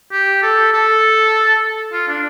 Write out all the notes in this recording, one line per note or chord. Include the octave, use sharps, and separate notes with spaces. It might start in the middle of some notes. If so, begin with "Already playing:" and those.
G4
A4
A4
F4
D4